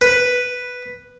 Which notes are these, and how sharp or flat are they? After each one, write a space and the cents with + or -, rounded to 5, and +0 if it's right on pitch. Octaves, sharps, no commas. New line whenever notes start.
B4 +0